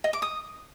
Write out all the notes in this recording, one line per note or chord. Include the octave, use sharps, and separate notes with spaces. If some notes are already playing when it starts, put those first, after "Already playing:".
D#5
D6
D#6